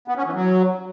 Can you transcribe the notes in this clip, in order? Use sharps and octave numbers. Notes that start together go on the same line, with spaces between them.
B3
C#4
E3
F#3